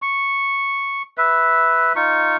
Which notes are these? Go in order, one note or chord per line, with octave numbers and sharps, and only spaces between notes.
C#6
B4 E5
D#4 F4 C#6